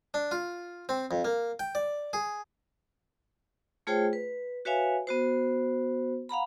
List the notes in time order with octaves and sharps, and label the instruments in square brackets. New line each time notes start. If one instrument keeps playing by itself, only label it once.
[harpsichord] D4
F4
C4
F2
A#3
G5
D5
G#4
[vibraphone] A3 F4 G#4 C5 C#5 G5
B4
F#4 B4 C#5 E5 F5 G#5
B3 F#4 C5
F5 F#5 A#5 B5